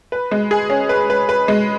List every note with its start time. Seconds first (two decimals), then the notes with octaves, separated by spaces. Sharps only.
0.12 B4
0.31 G#3
0.51 G#4
0.70 C#4
0.89 B4
1.10 B4
1.29 B4
1.48 G#3